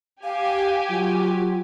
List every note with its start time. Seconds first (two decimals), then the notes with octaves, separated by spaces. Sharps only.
0.24 G4 F5 G#5
0.89 F#3 F4